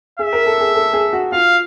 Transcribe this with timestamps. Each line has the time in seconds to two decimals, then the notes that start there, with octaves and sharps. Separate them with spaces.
0.19 G#4 E5
0.33 A#4
0.46 A4
0.61 G#4
0.75 A4
0.94 G#4
1.13 F#4
1.32 F4 F5